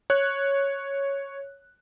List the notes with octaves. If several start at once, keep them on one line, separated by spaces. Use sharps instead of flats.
C#5 F#6